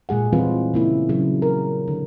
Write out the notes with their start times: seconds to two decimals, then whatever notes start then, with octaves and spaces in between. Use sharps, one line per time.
0.09 A#2 G#3 G#4 F#5
0.33 E3 G3 C4 F4 B4
0.74 C#3 A#3 E4
1.09 C#3 F#3
1.42 A#4
1.88 D3